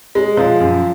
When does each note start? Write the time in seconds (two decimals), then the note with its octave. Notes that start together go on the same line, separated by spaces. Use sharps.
0.15 G#3
0.37 F3
0.60 F#2